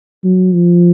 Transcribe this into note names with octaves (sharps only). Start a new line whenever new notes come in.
F#3
F3